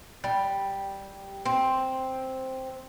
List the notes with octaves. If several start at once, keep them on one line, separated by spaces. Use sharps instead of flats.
G3
C4